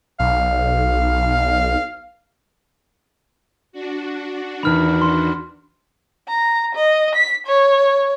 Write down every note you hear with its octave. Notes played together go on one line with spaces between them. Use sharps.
B1 F5
D4 F#4
E2 D#3 B5 F6
C6
A#5
D#5
B6
C#5